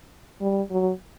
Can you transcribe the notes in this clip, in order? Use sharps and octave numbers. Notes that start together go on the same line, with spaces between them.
G3
F#3